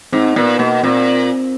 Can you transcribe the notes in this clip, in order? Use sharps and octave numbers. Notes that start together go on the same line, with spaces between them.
G#2 C4
A#2 B3
B2 A#3
A#2 C4